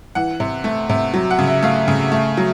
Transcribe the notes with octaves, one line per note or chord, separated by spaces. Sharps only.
E3 F#5
C3
A3
C3
F#3
F#5
C#3
E5
A3 F5
C#3
A3
F#3